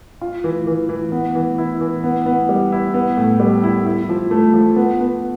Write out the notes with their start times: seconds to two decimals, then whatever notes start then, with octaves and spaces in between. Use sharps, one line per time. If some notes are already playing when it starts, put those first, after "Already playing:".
0.21 F4
0.44 E3
0.67 E3
0.89 E3
1.12 B3
1.35 E3
1.58 E4
1.81 E3
2.04 B3
2.26 B3
2.49 G3
2.72 E4
2.94 B3
3.17 A2
3.40 G3
3.63 E4
3.86 E4
4.09 F3
4.31 A3
4.54 F3
4.76 B3
5.00 B3